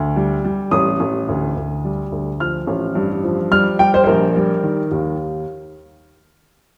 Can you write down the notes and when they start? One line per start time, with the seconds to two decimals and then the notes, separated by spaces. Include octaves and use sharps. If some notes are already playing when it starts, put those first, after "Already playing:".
Already playing: D2
0.16 G3
0.44 G3
0.71 A1 D#6
1.00 A1
1.29 D2
1.56 D2
1.84 G3
2.12 D2
2.40 F3 F6
2.67 A1
2.95 G2
3.23 F3
3.51 G3 F6
3.79 G3 G5
3.94 C5
4.04 C5
4.07 A#1 A#4
4.36 G3
4.64 D#3
4.92 D#2